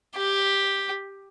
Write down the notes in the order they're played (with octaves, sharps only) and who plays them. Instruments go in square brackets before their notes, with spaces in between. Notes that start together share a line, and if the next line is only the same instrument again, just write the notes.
[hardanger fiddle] G4